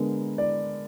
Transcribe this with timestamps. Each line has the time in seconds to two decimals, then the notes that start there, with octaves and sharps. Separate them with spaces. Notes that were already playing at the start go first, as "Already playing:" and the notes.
Already playing: D3 G#3 B3 A#4
0.38 D5